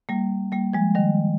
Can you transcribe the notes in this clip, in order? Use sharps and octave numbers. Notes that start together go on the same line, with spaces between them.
G3 A#3
G3 A#3
F3 G#3
D#3 G3